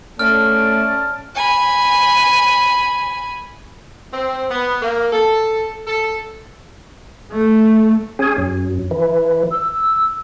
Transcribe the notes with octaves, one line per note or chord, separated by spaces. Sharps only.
A3 C#4 D5 A5 F6
G#5 B5
C4
B3
A#3
A4
A4
A3
C#4 G#4
F#2
E3
E6